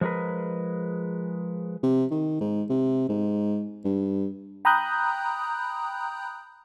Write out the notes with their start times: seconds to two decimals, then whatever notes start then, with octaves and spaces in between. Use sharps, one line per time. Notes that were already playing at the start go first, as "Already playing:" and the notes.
0.01 F3 G#3 G#4 A#4 B4
1.83 C3
2.11 D#3
2.40 G#2
2.69 C3
3.09 G#2
3.84 G2
4.65 G5 A#5 B5 D#6 F#6 G6